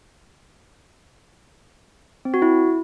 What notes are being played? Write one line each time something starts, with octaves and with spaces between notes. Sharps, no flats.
C4
F#4
E4